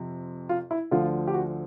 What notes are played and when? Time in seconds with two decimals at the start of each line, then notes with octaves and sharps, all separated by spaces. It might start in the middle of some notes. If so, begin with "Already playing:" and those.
Already playing: F2 C3
0.49 F4
0.71 E4
0.91 D2 D3 F3 F4
1.27 G4
1.34 F#4